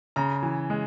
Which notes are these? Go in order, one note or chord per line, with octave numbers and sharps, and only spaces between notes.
C#3 A#5
E3
G#3